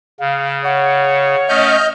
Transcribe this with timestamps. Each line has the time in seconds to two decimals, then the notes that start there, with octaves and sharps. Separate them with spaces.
0.20 C#3 F5
0.65 C#5 F#5
1.49 A3 C#4 D#5 F6 G6